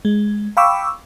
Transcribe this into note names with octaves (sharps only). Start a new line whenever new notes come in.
G#3
F5 G5 B5 C#6 D6 E6